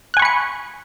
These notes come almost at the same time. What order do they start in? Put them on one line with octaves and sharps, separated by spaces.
F#6 G#5 C#6 B5 C#7